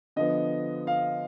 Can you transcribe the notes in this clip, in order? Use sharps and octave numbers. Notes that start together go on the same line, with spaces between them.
D3 F3 B3 D#5
F5